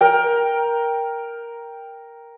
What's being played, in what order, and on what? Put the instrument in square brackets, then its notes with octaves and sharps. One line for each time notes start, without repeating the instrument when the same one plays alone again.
[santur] A#4 G5